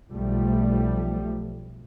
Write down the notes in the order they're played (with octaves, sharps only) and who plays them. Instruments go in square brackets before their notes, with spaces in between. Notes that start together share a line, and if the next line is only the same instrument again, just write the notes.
[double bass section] B1 F3 G3 A3